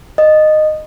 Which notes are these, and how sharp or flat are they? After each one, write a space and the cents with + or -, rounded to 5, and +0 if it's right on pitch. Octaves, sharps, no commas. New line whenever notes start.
D#5 -15